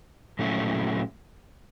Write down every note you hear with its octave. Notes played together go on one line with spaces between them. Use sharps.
A#2 F#3 A3 C#4 E4